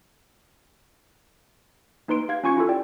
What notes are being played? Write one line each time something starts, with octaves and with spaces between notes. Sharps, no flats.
A#3 D#4 B4 C6 D7
G4 F5 G#6
C#4 F4 G#5 C#6 G#6 C#7
E4 F4 G4 A4
D5 G5